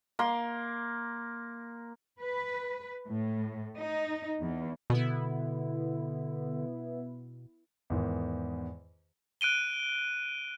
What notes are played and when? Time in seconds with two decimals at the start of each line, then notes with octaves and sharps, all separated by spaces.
0.19 A#3 C6
2.21 B4
3.07 A2
3.78 D#4
4.40 E2
4.90 B2 D3 B3 E4
7.90 E2 G#2 D#3
9.41 F#6 D7 D#7 G7